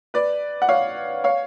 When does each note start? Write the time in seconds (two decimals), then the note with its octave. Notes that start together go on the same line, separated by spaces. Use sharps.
0.14 B4 D5
0.62 F#5
0.69 C#5 F5
1.24 C#5 F5